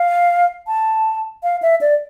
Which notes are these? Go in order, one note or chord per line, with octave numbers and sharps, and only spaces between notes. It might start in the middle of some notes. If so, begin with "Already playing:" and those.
Already playing: F5
A5
F5
E5
D5